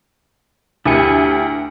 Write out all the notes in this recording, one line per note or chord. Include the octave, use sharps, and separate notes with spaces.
D2 E4 G4 G#5 C#7